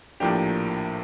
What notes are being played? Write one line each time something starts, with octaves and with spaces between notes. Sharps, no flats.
A#1 A2 F3 A#3 D4 G4 G5